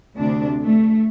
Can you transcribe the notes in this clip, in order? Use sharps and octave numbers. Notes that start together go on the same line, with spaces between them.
D2 C3 D4
A3